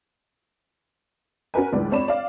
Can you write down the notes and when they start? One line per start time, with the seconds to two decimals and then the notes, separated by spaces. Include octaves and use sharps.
1.54 C#4 F#4 A#4 B4 G#5
1.73 C#2 G2 E3 B4 D5
1.91 C4 D4 C#5 D5 B5 E7
2.08 D5 F5